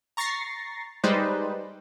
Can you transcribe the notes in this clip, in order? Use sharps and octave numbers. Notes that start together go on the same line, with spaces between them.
A#5 C#6 A6 A#6 C7
G3 G#3 D#4 B4 C5 D5